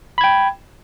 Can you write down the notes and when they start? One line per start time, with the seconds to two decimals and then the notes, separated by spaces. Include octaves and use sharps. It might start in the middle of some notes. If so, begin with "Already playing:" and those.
0.18 B5
0.21 G#6
0.24 G5